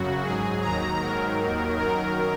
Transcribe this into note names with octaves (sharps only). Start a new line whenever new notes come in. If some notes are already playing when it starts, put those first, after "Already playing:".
Already playing: F#2 C#3 F#3 F#4
G#2 F#3 G#4
D#2 D#3 F#3 A#5
G#2 D#3 F#3 A#4
D#2 D#3 F#3
F#2 D#3 F#3 A#4